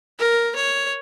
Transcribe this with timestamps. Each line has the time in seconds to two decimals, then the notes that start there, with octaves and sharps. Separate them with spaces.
0.19 A#4
0.56 C#5